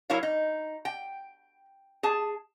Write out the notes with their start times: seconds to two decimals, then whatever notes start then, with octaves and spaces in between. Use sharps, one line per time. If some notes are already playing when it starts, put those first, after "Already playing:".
0.10 F#3 E4 A#4 C#5 F5
0.23 D#4
0.85 G5
2.03 G#4 A5